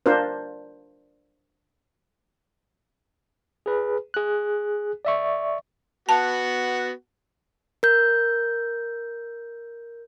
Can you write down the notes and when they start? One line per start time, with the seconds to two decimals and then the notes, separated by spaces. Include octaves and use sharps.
0.06 D4 F4 A#4 C5
3.66 G#4 B4
4.14 G#4 F#6
5.05 D5 E5 C#6
6.09 B3 F#4 F#5 A5
7.83 A#4 G6